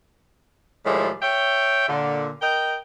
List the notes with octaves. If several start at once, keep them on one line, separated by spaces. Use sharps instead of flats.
A2 D#3 F3 G3 G#3
C#5 E5 G5
A#2 D3
A#4 D#5 G5